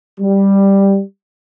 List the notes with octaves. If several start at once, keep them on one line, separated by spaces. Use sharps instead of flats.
G3